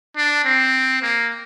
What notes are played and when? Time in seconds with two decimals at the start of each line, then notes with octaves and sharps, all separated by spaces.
0.17 D4
0.45 C4
1.02 A#3